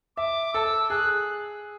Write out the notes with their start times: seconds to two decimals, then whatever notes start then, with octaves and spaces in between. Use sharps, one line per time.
0.17 E5 D6
0.54 A4 E6
0.90 G#4 F#6